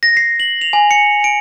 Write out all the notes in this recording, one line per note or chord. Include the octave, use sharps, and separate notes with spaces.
A#6
C7
F#7
F7
G#5
C#7
D7